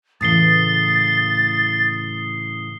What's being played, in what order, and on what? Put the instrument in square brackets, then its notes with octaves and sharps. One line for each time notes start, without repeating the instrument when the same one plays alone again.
[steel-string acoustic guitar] A2 C#3 E3 [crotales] D#6 C7 G7 [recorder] A6